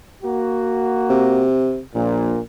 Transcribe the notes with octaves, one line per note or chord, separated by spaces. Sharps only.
A#3 F#4
C3
A#1 A#2